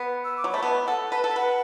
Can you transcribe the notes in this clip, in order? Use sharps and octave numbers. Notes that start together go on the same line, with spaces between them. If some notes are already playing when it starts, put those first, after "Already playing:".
Already playing: B3
E6
D6
F#3
A3 B5
B3 A5
A4 F#5
B4 A5
A4
A5
B4 F#5